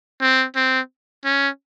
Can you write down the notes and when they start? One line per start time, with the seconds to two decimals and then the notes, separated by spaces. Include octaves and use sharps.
0.21 C4
0.56 C4
1.25 C#4